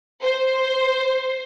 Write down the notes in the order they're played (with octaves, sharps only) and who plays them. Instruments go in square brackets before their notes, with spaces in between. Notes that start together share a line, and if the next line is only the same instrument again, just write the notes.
[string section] C5